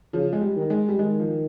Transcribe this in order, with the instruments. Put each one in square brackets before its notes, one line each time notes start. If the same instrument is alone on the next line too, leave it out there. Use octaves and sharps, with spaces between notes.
[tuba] C#3 [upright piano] F3
[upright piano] G#3
G3
[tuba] D#3
[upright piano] G#3
G3
[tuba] D#3 [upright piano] G#3
[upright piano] F3